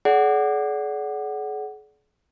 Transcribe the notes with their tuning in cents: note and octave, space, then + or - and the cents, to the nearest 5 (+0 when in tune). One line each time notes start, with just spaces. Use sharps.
G#4 +40 D5 -25 F#5 +10